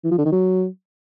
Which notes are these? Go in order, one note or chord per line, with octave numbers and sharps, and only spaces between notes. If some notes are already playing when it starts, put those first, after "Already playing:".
E3
F3
D3
D#3
F#3